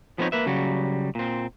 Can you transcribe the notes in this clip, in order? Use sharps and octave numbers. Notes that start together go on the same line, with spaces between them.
F3 B3 C4 D#4 C#5
A#3 B4 E5
C#3 F#3 G3 F#4
A#2 C4